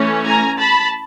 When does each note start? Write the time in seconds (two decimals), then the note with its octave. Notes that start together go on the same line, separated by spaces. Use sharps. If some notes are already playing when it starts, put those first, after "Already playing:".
Already playing: E3 A3 C#4
0.25 G#5 A#5
0.59 A5 B5